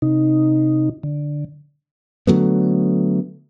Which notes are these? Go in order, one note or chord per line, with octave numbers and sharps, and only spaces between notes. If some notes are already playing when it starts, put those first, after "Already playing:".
C3 D#4
D3
D3 F#3 A3 B3